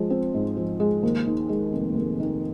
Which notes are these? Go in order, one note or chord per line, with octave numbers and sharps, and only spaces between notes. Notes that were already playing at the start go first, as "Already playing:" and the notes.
Already playing: F3 G#3
C4
G#2
F3
G#3
D#2
D#3
G#3
F1
D#2
D#3